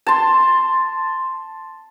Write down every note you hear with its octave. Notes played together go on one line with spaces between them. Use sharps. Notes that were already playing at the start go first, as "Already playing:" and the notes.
A5 C6